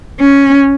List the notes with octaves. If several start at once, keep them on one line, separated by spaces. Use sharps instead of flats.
C#4